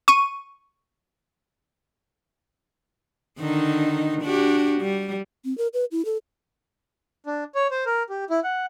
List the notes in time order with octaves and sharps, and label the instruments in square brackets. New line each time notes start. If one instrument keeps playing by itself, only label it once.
[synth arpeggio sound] C#6 D#7
[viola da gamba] D3 D#3 D#4
D4 F#4 G4
G3
[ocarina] C4
A#4
B4
E4
A4
[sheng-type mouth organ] D4
C#5
C5
A#4
G4
E4
F#5